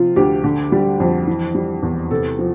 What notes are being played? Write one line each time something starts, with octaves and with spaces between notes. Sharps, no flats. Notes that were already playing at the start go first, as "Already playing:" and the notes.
Already playing: C3 F3 F4
D2 G4
D3
G3
F2
E3
G3
E2
C3 A4
F3